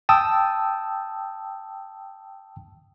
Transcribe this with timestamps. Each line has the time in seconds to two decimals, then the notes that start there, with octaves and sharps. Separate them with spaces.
0.09 G5 A5 D#6 E6